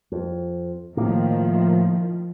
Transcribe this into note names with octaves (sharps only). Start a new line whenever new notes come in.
F2
A2 D#3 F3 A#3